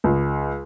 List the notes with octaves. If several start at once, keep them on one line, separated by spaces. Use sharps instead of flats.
C#2